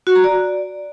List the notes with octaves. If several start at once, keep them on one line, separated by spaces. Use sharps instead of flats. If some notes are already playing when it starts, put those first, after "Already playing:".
F#4
A#5
D5